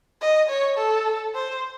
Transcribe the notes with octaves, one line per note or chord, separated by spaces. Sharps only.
D#5
C#5
A4
C5